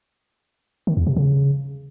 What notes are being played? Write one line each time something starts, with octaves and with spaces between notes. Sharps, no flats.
D#3
E2
C3
C#3